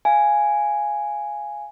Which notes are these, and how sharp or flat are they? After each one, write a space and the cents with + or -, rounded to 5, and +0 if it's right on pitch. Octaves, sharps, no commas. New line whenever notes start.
F5 -10 G#5 +0